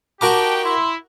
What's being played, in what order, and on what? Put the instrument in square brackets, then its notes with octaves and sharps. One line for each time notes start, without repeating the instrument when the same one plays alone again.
[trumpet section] D#4 G4 G5 [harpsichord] F#4 A#4 D6 [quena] A5
[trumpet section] E4 [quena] C6